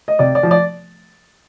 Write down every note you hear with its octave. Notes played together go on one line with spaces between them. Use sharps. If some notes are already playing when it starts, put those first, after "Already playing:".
D#5
C3 D5
D5
F3
D5